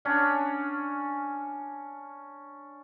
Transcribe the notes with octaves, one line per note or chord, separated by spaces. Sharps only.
C#4 D4 F#5